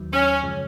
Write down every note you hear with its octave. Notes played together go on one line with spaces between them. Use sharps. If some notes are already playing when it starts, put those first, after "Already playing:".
Already playing: D#2 D#3 F#3
C#4
F#2 C#3 F3 G#3